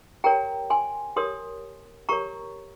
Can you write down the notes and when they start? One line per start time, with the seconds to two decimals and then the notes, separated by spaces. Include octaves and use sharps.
0.24 G4 A#4 C#5 G5 A#5
0.70 G#5 C6
1.16 G4 A#4 C#5 C6 D#6
2.09 G4 A#4 C#5 A#5 C#6